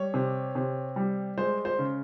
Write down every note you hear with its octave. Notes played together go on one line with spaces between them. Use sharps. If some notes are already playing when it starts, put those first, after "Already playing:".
Already playing: G3 C#5
C3
C3
G3
G#3 C5
C5
C#3